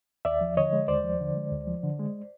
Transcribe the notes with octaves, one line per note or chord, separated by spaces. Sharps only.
D#2 D5 E5
F3
D3 C#5 D#5
G#3
D#2 C5 D5
F3
D3
G#3
D2
F3
D3
G#3